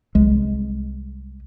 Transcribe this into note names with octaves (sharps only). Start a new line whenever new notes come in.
C2 G#3